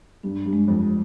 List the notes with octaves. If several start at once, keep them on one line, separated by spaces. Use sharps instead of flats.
G2 D4
G2
G#3
F2